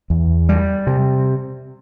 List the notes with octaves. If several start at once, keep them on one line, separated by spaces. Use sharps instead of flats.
E2
G3
C3